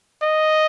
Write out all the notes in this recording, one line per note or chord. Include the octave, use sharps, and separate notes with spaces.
D#5